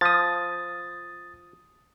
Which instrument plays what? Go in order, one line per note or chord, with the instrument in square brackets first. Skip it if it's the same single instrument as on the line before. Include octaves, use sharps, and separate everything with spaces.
[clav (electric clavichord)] F3 [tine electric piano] D#6 A6